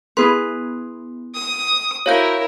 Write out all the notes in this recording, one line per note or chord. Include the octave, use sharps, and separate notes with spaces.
B3 E4 G#4 B4 C6
D#6
E4 F#4 A#4 C5 C#5 F5 G6